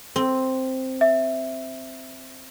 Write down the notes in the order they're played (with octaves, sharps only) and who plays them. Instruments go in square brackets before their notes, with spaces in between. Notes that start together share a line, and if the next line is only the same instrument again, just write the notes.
[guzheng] C4
[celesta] E5